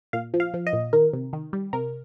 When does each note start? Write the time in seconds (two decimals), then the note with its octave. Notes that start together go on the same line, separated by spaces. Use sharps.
0.13 A#2 F5
0.34 F3
0.40 F5
0.54 F3
0.67 D#5
0.73 A#2
0.93 D#3 A#4
1.13 C3
1.33 D#3
1.53 G3
1.73 C3 A#4